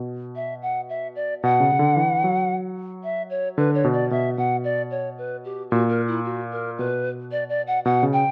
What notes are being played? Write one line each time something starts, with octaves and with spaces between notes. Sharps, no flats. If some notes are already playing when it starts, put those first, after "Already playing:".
Already playing: B2
E5
F#5
E5
D5
B2 F#5
C#3
C#3
D3
E3
F#3
E5
C#5
D3 B4
C#5
B2
D5
B2 E5
B2 F#5
D5
C#5
B4
G4
A#2 F#4
A#4
E4
F#4
A#4
B2 B4
D5
D5
F#5
B2 F#5
C#3
G5